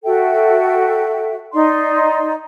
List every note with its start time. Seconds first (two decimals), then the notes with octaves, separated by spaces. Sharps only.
0.04 F#4 A4 E5 G5
1.53 D#4 D5 C6